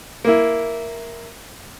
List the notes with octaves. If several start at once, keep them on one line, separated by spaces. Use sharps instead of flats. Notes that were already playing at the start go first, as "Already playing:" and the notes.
A#3 E4